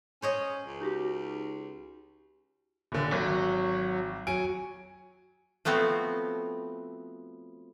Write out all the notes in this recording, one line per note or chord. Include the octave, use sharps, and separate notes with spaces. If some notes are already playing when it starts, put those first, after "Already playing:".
C#4 C5 C#5 D#5
C#2
D#4 F#4 G4
D#1 D3
G#1 F#3
F#3 G#5 D7
F3 A3 B3 C4 F#4